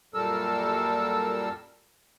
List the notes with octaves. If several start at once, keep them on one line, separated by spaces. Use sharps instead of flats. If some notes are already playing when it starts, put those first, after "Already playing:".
F#2 A#2 G3 A4 A#4 E6